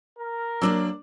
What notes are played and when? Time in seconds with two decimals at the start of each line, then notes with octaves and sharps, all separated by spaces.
0.19 A#4
0.62 F#3 A3 A#3 D4 D6 E6